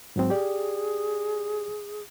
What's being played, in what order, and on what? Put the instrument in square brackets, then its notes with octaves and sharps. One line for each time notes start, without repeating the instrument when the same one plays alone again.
[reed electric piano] G#2 F#3 C4
[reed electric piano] G4 D5 [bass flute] G#4